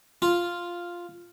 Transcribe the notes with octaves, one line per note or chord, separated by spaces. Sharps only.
F4